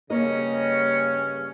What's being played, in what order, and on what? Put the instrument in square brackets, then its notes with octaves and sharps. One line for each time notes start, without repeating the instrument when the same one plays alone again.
[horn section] G2 C#3 C#4 [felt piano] A#3 [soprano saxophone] D#5